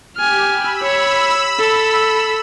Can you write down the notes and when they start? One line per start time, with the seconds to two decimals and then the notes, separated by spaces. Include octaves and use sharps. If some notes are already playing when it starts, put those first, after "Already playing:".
0.17 G4 G#5 F6
0.49 B5 E6
0.83 C#5
1.59 A4